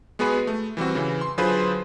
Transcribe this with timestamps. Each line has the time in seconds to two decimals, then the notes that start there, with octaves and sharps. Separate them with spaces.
0.19 G#3 B3 F#4 G#4 B4
0.47 A3
0.77 E3 G3 C4 F#4
0.95 C#3 E3
1.21 C6
1.38 D3 F#3 F4 G#4 B4 C5